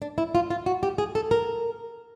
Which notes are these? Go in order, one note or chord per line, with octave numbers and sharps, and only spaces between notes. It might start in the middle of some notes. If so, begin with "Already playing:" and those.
D4
E4
F4
F4
F#4
G4
G#4
A4
A#4